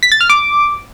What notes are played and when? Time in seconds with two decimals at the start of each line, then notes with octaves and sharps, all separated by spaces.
0.03 B6
0.12 A6
0.21 F6
0.29 D6